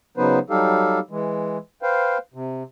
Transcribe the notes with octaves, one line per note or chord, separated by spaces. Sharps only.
C#3 F#3 B3 D#4 B4 C5
F#3 G3 D#4 G4 A4 F5
E3 G#3
B4 C5 F5 G5
C3